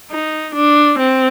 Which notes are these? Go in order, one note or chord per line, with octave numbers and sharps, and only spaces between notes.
D#4
D4
C4